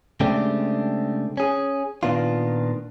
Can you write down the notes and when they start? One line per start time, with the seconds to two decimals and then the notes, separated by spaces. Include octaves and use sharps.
0.20 C#3 G#3 A3 C4 D4 G4
1.37 C#4 G#4
2.03 A#2 D#3 B3 D4 F4